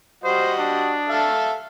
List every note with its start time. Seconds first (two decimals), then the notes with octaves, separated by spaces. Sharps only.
0.24 G3 F#4 C5 D#5
0.59 D4
1.09 A4 E5 F5